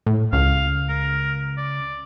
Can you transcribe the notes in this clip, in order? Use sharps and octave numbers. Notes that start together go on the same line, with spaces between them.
A2
C#2 F5
A#4
D5